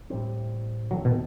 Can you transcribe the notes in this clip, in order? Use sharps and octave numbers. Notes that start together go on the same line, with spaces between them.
A2 G3 C4
E2 D#3 F#3 A3 C4
B2